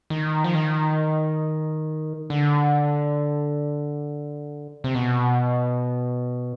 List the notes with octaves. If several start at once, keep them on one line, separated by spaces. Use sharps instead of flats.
D#3
F3
D#3
D3
C3
B2